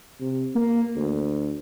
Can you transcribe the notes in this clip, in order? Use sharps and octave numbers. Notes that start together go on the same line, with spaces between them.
C3
A#3
D2